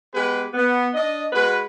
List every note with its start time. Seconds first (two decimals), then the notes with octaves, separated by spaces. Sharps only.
0.14 G#3 B3 G4 G#4 B4
0.54 B3
0.94 D4 D#5
1.33 G#3 F#4 B4